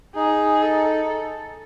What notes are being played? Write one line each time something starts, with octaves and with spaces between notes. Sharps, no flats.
D#4 G#4
A4